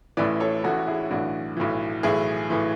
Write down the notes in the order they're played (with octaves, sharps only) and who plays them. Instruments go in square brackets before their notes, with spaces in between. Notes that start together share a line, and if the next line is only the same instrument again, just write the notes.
[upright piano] A1 A2 E3 B4 D5
A4 C#5
A1 A2 E3 F#4 A4
E4 G#4
B1 A2 E3 D4 F#4
B1 A2 E3
B1 A2 E3 E4 G#4
A2 E3